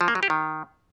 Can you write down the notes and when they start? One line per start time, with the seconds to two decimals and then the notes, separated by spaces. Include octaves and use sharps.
0.01 F3
0.08 A#3
0.15 F#3
0.23 G4
0.30 D#3